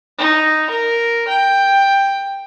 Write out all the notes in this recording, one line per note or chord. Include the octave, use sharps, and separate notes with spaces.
D#4
A#4
G5